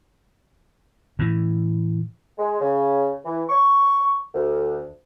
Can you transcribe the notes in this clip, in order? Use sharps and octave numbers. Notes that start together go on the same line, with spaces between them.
A2 E3
G#3
C#3
E3
C#6
D2